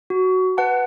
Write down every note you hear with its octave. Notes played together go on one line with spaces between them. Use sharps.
F#4
B4 F#5 A5